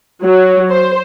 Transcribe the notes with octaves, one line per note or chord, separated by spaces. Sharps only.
F#3
C5